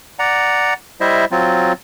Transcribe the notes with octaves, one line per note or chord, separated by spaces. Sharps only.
D5 F#5 A#5
G3 E4 C5 D#5 E5
F#3 C4 F4